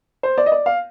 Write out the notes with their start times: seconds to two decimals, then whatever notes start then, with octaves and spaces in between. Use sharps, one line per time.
0.23 C5
0.38 D5
0.46 D#5
0.52 D5
0.66 F5